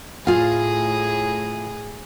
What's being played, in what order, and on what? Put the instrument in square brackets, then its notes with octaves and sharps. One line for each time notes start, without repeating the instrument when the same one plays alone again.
[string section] A2 G#4 [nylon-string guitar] F4 F5